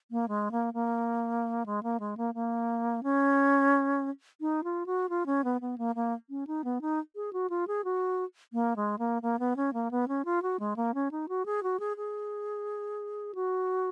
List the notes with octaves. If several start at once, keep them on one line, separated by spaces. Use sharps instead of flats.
A#3
G#3
A#3
A#3
G#3
A#3
G#3
A#3
A#3
C#4
D#4
F4
F#4
F4
C#4
B3
B3
A#3
A#3
C#4
D#4
B3
D#4
G#4
F#4
F4
G#4
F#4
A#3
G#3
A#3
A#3
B3
C#4
A#3
B3
C#4
F4
F#4
G#3
A#3
C#4
D#4
F#4
G#4
F#4
G#4
G#4
F#4